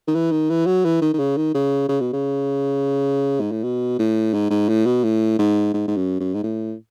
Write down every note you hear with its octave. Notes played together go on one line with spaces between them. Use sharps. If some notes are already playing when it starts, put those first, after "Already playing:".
D#3
E3
D#3
E3
F#3
E3
D#3
D#3
C#3
D#3
C#3
C#3
B2
C#3
G#2
A2
B2
A2
G#2
G#2
A2
B2
A2
G#2
G#2
G#2
F#2
F#2
G#2
A2